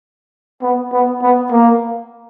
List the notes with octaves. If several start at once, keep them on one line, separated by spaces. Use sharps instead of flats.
B3
B3
B3
A#3